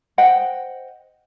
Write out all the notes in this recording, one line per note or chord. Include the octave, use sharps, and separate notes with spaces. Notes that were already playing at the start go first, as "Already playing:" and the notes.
C5 D#5 F#5 G5